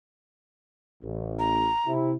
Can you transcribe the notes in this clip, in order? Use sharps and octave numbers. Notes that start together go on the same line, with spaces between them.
A1
A#5
C3 E4